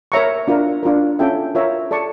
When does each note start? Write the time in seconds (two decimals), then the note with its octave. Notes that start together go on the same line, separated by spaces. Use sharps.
0.12 A#4 C#5 E5 A#5 C#6
0.48 D4 F4 A#4
0.83 D4 F4 A#4
1.19 C#4 F4 A4 E5 G5
1.55 F4 A#4 C#5 E5 A#5
1.91 A4 D5 A5 C#6